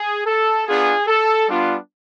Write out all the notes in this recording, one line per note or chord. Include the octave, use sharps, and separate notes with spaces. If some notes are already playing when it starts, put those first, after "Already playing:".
Already playing: G#4
A4
B3 D4 F4 G#4
A4
G3 B3 D4 F4